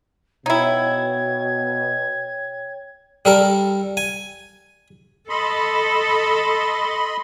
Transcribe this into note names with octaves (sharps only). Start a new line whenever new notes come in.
B2 D#4 E4 C#5 G5 G#6
G3 A4 A#4
G#5
A4 D#5 B5 C6